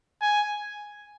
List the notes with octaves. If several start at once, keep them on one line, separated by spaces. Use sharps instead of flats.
G#5